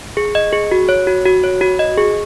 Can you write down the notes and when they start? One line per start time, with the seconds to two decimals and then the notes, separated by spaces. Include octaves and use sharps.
0.17 G#4
0.35 D#5
0.53 G#4
0.72 F#4
0.89 C#5
1.07 F#4
1.25 F#4
1.44 C#5
1.61 F#4
1.79 D#5
1.98 G#4